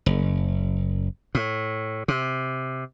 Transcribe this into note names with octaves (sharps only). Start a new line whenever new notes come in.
F#1
A2
C3